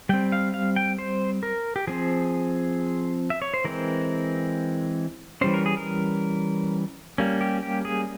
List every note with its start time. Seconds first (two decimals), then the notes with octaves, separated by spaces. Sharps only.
0.09 G3 C4 G5
0.32 F5
0.54 F5
0.76 G5
0.99 C5
1.43 A#4
1.76 G4
1.87 F3 C4 G#4
3.30 E5
3.42 C#5
3.54 C5
3.65 E3 G#3 C4 A#4
5.41 E3 G3 C#4 C5
5.54 A#4
5.66 G#4
5.77 A#4
7.18 G3 A#3 C#4
7.41 G4
7.63 G4
7.85 G#4